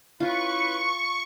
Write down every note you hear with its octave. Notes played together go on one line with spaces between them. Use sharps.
C#4 E4 F4 B4 C#6